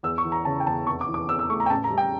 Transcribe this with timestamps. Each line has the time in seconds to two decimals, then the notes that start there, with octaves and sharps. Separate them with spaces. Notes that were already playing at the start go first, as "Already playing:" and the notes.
0.03 E2 E6
0.18 C#6
0.25 E3
0.32 A#5
0.45 C#3 A5
0.60 G5
0.66 E2 A5
0.87 F1 C#6
1.01 D6
1.08 E3
1.14 D6
1.28 E2 E6
1.39 E6
1.49 A3 C#6
1.60 A#5
1.66 G5
1.70 A1 A5
1.84 A#5
1.90 G3
1.98 G5